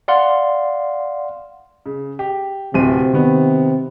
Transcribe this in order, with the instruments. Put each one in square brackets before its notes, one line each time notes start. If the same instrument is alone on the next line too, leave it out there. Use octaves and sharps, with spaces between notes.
[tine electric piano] D5 F5 F#5 C6
[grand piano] C#3
G4
[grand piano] D1 C4 D#7 [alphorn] C3
[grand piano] D#3 B3